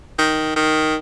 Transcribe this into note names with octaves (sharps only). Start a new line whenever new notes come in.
D#3
D#3